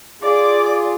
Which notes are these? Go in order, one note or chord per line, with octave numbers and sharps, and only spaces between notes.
F4 G#4 D5 D6